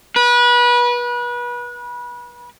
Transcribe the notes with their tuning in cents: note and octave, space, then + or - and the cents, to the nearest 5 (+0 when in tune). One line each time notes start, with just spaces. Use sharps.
B4 -30